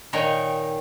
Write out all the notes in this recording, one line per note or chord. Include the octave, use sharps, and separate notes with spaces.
A#2 D#3 D#4 C5 C#5 G5